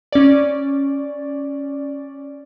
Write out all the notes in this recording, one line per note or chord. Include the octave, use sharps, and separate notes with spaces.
C#4 D5